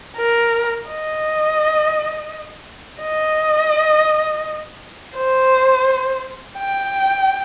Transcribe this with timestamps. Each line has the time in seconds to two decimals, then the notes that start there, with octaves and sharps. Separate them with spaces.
0.17 A#4
0.89 D#5
3.02 D#5
5.16 C5
6.59 G5